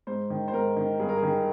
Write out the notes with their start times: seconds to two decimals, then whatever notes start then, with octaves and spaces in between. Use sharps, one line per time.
0.07 G#2 C5
0.30 D#3
0.48 C5
0.53 G#2 A#4
0.77 D#3
1.00 G2 G#4
1.09 A#4
1.17 G#4
1.23 D#3